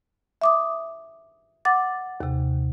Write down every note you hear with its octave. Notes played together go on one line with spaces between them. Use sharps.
E5 D6 D#6
F#5 D6 A6
D#2 C3